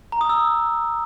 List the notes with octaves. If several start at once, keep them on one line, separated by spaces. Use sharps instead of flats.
A#5
D#6
E6